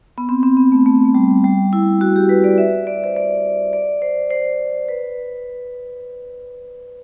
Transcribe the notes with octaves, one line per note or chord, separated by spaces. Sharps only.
B3
C4
C4
B3
A3
A3
G3
G3
E4
F#4
G4
B4
D5
E5
D5
C5
D5
D5
C5
C5
B4